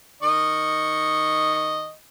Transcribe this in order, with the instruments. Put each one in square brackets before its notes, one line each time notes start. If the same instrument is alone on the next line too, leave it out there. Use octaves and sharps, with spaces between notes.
[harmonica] D#3 D#5 C#6